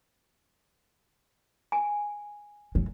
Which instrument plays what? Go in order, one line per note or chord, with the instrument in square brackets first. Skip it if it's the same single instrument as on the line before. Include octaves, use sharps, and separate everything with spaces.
[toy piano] G#5
[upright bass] F#3